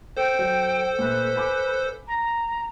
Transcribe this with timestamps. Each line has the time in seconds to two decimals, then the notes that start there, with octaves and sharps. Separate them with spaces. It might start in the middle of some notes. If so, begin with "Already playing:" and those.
0.17 A4 C5 G5
0.39 F#3
0.99 A#2 A3 B4
1.36 G#5 B5 D6
2.08 A#5